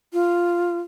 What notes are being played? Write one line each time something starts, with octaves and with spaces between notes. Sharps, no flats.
F4